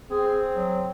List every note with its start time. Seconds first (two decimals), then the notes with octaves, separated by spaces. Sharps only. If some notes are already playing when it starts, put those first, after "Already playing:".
0.11 C4 G#4
0.55 F#3